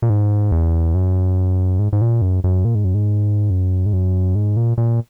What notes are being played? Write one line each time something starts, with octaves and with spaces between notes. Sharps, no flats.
A#2
G#2
E2
F#2
G#2
G#2
A#2
F#2
F#2
A#2
G#2
F#2
G#2
F#2
G#2
F#2
G#2
A#2
A#2